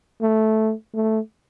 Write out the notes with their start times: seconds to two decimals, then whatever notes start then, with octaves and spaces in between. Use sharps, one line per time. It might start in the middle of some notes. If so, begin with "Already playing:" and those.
0.22 A3
0.94 A3